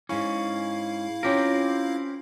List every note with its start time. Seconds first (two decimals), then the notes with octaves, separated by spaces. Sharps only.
0.09 G#2 C#4 E4 F5
1.23 C4 C#4 F4 G4 A#4